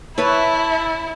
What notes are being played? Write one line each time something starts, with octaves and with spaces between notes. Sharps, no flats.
E4 B4 C#5 E5 A5